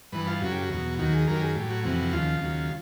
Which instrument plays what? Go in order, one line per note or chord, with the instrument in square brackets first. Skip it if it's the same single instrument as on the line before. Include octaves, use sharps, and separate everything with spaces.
[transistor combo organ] G2 E3 B4
F4
F#2 C#3 F#3 F#4
G4
F#4
E2 B2 F#3
D#2 D#3 F#3 F#4
G#4
F#2 D#3 F#3 A#4
G4
G#4
A2 F#3 G4
F#4
F2 C3 E3 F#4
D#2 C#3 F3 F4
D#2 C#3 F#3